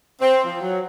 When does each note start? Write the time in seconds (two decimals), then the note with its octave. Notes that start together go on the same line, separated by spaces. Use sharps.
0.21 C4
0.45 F3
0.60 F#3